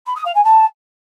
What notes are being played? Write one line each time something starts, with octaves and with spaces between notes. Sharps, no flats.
B5
D#6
F5
G#5
A5